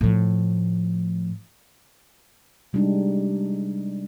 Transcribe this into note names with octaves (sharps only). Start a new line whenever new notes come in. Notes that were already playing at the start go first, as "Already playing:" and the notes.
A2 F3
C3 G3 G#3 D4 D#4 G4